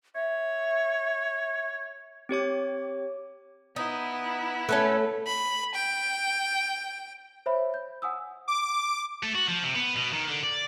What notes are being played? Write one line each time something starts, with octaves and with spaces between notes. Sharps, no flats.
C#5 E5
C4 G4 C#5 D6
B3 D#4 E4
A3 C#4 A4 B4
B5
G5
C5 C#5 E5 B5
G6
F#5 G#5 D#6 E6
D6
A3
F#4
F3
C3
B3
B2
D#3
D3
D5